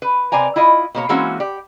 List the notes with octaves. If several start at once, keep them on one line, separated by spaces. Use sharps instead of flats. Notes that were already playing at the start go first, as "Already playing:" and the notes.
B4
C3 C4 D5 G#5 A#5
E4 F4 D#5
B2 A#3 C#5
E3 G#3 A#3 C4 C#4 F#4
G4 D5